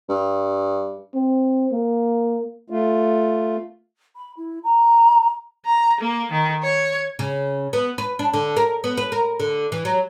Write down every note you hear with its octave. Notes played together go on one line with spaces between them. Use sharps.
G2
C4
A#3
A3 F4
B5
E4
A#5
A#5
A#3
D#3
C#5
C#3
B3
B4
D4
D3
A#4
B3
B4
A#4
D3
E3
F#3